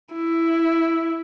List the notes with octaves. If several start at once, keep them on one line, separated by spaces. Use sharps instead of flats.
E4